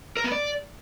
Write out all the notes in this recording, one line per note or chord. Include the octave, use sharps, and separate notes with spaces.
A#4
B3
D5